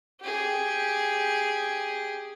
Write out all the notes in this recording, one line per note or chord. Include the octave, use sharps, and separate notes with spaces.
G4 G#4